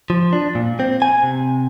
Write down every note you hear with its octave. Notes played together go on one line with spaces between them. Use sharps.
F3
D4
A#2
C4
G#5
C3